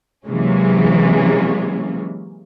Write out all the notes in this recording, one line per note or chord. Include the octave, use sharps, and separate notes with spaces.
C3 E3 F#3 G#3 A#3 C#4